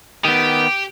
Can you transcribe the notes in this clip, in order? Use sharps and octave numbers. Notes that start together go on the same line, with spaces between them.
D#3 B3 G4